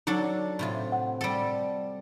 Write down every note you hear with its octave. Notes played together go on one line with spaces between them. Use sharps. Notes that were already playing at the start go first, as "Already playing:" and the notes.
F#3 D4 D#4 A4
A2 C3 F4
F#5
G3 A4